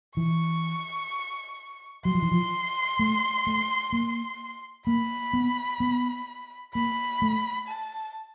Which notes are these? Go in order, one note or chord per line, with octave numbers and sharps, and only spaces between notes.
E3 C#6
F#3 C6
F3
E3
F3
A3
A3
A#3
A#3 B5
B3
B3
A#3 B5
A3
A5